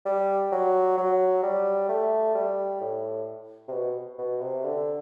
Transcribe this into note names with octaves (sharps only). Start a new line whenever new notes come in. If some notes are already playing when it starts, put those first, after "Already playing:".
G3
F#3
F#3
G3
A3
G3
A2
C3
B2
B2
C3
D3